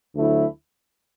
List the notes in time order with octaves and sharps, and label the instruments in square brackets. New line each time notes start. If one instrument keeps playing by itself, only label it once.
[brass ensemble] D2 D3 F#3 A3 E4